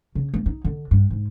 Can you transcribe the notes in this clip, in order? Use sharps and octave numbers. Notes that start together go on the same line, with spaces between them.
C#3
A#3
D#4
D3
G2
G#2